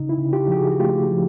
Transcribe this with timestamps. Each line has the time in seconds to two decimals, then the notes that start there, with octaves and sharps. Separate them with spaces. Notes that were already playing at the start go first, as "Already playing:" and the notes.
Already playing: C#3 D#4
0.09 E4
0.17 C#3
0.33 F4 G4
0.48 F3 G4
0.56 F#4 G#4
0.72 F#4
0.79 A3 F4 G4
1.11 F3